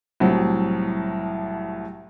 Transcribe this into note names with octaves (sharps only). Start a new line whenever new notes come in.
C2 A2 F3 F#3